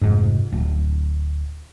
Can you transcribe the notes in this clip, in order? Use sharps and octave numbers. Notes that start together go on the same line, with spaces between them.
F1 G#2
D1